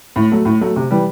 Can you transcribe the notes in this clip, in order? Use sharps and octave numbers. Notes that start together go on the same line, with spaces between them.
A2
F#3 A3
A2
F#3 A3
C3
E3 G3